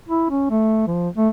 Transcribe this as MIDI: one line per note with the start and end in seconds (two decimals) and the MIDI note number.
0.09 0.27 64
0.30 0.48 61
0.50 0.84 57
0.87 1.09 53
1.17 1.29 57